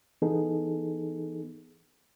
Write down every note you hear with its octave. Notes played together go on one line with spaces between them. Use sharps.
E3 B3 D#4 G#4 A4